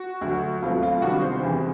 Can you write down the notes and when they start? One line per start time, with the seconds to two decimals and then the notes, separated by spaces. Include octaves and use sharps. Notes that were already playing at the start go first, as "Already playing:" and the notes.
Already playing: F#4
0.21 D2 D3 F#3
0.62 C#2 B2 F#3 A3 C4 F4
0.83 F4
1.02 C3 D#3 G3 B3 D4 F#4
1.22 C5
1.42 E2 C3 E3 G#3